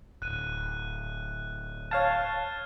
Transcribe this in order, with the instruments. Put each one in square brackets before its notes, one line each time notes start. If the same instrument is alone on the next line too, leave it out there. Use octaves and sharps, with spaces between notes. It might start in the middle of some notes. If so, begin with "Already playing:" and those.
[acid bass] D1 [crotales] F#6 D#7
[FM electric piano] C#5 F5 A5 [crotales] F6 G6 G#6